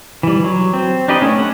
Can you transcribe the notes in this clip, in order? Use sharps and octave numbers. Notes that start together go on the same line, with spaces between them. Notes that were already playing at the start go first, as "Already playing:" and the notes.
E3 G3
F#3
C4
D4 D#4 G4 B4 D#5
A3 C#4
F#5